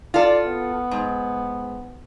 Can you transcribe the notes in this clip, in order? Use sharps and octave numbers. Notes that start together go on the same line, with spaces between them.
F4 A4 D5
B3
G#2